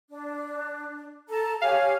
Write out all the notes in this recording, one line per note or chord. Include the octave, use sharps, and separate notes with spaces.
D4
A4 A5 A#5
G4 C#5 F5 G#5